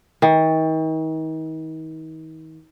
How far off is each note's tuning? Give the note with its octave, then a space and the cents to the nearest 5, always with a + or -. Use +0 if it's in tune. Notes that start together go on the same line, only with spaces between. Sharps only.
D#3 +40